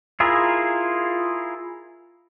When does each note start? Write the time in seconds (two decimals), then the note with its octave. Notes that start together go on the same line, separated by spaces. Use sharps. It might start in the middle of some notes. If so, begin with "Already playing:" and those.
0.20 E4 F4 G#4 A#4